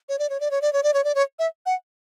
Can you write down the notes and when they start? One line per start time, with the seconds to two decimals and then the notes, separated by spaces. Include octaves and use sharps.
0.09 C#5
0.19 D5
0.30 C#5
0.40 D5
0.51 C#5
0.61 D5
0.73 C#5
0.83 D5
0.94 C#5
1.04 D5
1.15 C#5
1.39 E5
1.66 F#5